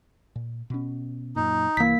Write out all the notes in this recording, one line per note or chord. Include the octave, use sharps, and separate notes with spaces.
A#2
B2 C#4
F#2 A#2 D#4
C2 E3 A#3 B6